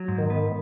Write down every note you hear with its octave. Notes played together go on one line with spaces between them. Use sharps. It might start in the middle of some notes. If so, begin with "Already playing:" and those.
Already playing: F#3
G#2
D#3
B3